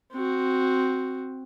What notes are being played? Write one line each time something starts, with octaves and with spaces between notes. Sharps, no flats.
C4 F#4